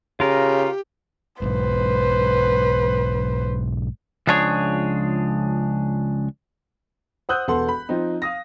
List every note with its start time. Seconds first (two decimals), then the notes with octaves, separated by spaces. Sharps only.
0.20 C#3 F4 G4 A#4
1.42 B1 G#2 B4 C5
4.27 C#2 F3 D4 G#4 C#5
7.29 C5 F#5 D#6 E6 F#6 G6
7.48 E1 B3 A4 B4 F#5 C6
7.69 B5
7.89 F3 C4 D#4
8.22 F5 D#6 A#6